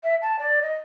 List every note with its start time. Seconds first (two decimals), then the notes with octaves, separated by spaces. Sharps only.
0.03 E5
0.22 A5
0.39 D5
0.62 D#5